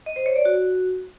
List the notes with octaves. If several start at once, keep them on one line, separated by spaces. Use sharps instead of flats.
D#5
C5
C#5
D5
F#4